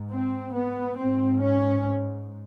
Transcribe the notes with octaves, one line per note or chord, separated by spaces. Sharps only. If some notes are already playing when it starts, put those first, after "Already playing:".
Already playing: G#2
C4
B3
G#2 C4
C#4